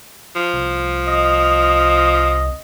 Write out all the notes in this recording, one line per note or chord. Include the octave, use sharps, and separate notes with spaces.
F3
C2
D#5